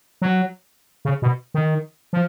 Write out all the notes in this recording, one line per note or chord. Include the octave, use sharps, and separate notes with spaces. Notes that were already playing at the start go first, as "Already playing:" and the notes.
F#3
C#3
B2
D#3
F3